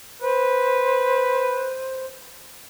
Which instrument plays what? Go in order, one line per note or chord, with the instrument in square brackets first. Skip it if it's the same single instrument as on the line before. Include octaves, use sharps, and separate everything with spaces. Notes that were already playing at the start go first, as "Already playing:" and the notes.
[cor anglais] B4 [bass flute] C5